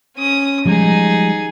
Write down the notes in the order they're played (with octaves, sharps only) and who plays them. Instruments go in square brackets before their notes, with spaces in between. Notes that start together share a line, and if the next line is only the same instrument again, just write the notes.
[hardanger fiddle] C#4 D#6
[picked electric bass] F3 G3 G#3 [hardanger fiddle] D#4 G#4